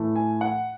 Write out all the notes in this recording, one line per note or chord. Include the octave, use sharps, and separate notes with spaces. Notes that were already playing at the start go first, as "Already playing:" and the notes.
Already playing: A2 E3 A3
G#5
F#5